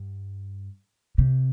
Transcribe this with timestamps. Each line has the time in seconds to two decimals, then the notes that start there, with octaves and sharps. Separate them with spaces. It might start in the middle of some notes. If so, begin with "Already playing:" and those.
Already playing: G2
1.18 C3